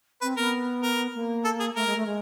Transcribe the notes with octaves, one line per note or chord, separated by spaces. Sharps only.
C4 B4
B3 A#4
A#4
A#3
A4
G#4
A3 A#4
G#3
A3
G#3